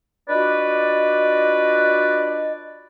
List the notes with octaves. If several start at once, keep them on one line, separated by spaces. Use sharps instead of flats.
D4 F4 F#4 B4 D5 D#5